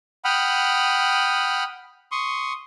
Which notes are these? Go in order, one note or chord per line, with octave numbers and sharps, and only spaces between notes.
F#5 G5 B5 D#6 F6
C6 C#6 D#6